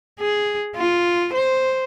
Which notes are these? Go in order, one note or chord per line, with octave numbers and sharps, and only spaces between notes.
G#4
F4
C5